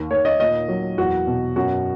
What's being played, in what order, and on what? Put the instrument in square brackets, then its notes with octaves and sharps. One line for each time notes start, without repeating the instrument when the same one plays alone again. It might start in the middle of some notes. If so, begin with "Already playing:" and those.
Already playing: [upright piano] D#2
D#2 C#5
D#5
A#2 D#5
F#3
E2 F#4
B2
F#2 F#4